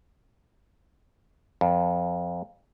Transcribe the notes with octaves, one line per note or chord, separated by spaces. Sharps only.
F2